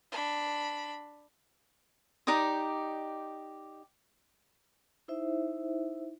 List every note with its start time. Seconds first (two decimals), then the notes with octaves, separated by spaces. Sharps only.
0.12 D4 B5
2.27 D#4 G4 D5 D#6
5.08 D#4 E4 C5 E5